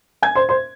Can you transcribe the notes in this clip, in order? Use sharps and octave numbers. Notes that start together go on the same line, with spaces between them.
G#5 G#6
C5 C6
C5 C6